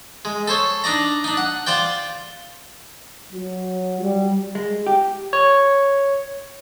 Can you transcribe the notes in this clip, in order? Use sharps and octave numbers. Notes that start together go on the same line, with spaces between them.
G#3
A4 C5 C#5
D4 D#4 D5 A#5
D4 D#4
F#5
F4 C5 D5 G5
F#3
G3
G#3
G4
C#5